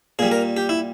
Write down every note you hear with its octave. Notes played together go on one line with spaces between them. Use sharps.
A#2 G3 G#4
A#4
G4
E4